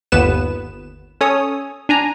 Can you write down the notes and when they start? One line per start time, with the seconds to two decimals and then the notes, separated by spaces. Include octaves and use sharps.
0.12 G1 D#2 B3 B4 E7
1.21 C#4 A4 C#5 D#6
1.89 D4 G#5 A#5